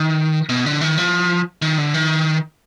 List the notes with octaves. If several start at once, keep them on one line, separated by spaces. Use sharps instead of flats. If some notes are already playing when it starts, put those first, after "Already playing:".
Already playing: D#3
B2
D3
D#3
F3
D#3
D3
D#3